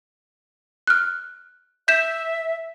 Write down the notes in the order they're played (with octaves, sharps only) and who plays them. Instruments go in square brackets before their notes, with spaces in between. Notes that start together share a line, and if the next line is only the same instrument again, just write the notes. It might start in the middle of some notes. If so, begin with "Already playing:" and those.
[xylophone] F6 F#6
[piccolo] E5 [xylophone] G6 B6 E7